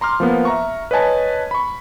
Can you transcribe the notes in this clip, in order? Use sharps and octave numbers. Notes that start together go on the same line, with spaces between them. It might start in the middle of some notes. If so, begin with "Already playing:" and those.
A#5 C6 D6 F6
F3 A#3 B3
E5 A#5 C#6
B4 C#5 D#5 G#5 A5
B5 C#6